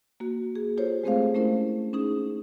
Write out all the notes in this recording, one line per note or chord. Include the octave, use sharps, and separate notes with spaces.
A#3 F#4
G#4
F4 G4 A4 C5 C#5
G#3 A3 C4 G#4 C5 F5
A3 C#4 E4 A#4 C5
C#4 D#4 G#4